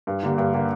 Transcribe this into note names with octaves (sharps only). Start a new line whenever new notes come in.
G2
D3 A#3 G4
G2
D3 A#3 G4